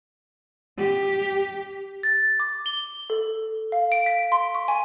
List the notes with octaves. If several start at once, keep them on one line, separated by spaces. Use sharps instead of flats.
G4
A6
D6
G7
A4
F5
D7
B6
C6
C#6
G#5